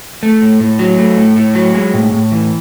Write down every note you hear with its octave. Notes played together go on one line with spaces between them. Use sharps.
A3
A2
A2
F#3
A3
A2
A2
F#3
G#3
A2
A2
E3